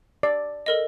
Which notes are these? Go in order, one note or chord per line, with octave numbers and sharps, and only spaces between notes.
D5
A4 A#4 D#5